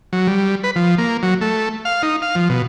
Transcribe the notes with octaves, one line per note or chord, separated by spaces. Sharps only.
F#3
G3
B4
F3
A#3
F#3
A3
F5
D#4
F5
F3
B2